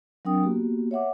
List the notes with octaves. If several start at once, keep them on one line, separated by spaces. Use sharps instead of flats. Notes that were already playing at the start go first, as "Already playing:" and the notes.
F#3 C4 D4 A#4 G5 D#6
A#3 B3 F#4 G4
C#5 E5 F#5 D6